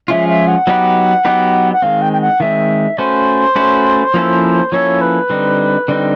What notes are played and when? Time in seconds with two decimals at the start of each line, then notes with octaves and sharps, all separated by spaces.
0.08 F3 G#3 C#4 F4 E5
0.28 E5
0.47 F#5
0.67 F#3 B3 D#4 G4 B4
1.25 F#3 B3 D#4 G4 B4
1.73 F#5
1.82 D#3 G#3 C4 F5
2.01 G5
2.13 G5
2.21 F#5
2.40 D#3 G#3 C4 E5
2.98 A3 C#4 F#4 B4 C5
3.56 A3 C#4 F#4 B4
4.14 F3 A#3 C#4 E4 A4
4.72 F3 A#3 C#4 E4 A4 C#5
5.01 B4
5.30 D3 G3 C4 D#4
5.88 D3 G3 C4 D#4